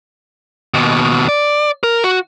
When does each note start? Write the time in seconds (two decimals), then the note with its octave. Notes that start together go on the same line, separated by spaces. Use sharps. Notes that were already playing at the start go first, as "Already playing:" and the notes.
0.74 D#2 B2
1.29 D5
1.83 A#4
2.04 F#4